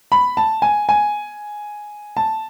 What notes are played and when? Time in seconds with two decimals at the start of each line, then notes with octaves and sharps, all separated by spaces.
0.12 B5
0.37 A5
0.62 G#5
0.89 G#5
2.17 A5